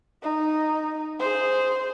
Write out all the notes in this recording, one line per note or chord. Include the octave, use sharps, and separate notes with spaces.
D#4
G#4 C5